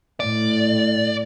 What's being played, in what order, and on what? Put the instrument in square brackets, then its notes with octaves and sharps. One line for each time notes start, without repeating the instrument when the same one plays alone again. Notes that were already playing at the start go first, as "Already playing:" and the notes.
[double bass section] A2 [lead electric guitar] D5